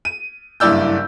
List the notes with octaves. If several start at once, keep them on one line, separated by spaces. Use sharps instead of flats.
D#7
F#1 G2 E4 D5 E6 G6